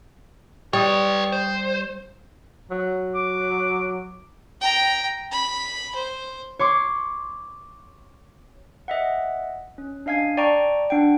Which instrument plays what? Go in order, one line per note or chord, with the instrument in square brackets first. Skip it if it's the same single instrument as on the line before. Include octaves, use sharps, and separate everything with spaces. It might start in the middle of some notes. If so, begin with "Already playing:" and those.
[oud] G3 [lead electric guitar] B4 C#5 [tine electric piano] G5 D#6
[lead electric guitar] C5
[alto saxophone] F#3
[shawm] D6
[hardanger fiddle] G5 A#5
B5
C5
[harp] C#5 C6 D6
[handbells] D#5 E5 F#5
C#4
D4 D#5 F5 G#5 G#6
D5 G5 A5 A#5 C#6
D4 F#5 G5